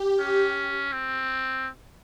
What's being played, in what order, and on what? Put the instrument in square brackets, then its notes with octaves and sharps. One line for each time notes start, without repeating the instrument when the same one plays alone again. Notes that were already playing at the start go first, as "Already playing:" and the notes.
Already playing: [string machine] G4
[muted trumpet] C#4
C4